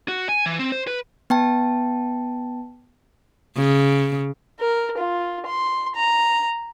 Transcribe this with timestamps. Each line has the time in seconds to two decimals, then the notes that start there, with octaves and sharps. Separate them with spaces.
0.08 F#4
0.29 G#5
0.46 E3
0.59 C4
0.72 C5
0.87 B4
1.30 B3 G5 A5
3.57 C#3
4.60 A#4
4.98 F4
5.46 C6
5.95 A#5